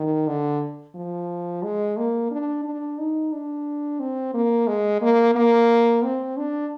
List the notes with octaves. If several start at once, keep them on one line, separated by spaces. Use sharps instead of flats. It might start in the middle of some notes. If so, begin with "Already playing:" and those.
Already playing: D#3
D3
F3
G#3
A#3
D4
D4
D#4
D4
C4
A#3
G#3
A#3
A#3
C4
D4